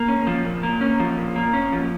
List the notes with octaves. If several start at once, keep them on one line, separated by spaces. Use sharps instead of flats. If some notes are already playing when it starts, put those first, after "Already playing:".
Already playing: A#3
C#4
F3
A#2
A#3
C#4
F3
A#2
A#3
C#4
F3